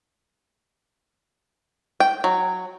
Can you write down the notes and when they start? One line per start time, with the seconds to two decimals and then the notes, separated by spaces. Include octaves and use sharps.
2.00 G5
2.24 F#3